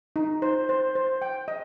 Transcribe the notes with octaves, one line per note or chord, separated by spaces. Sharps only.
D#4
C5
C5
C5
G5
D#5